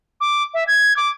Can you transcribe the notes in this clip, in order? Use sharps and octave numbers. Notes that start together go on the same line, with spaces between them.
D6
E5
G#6
D6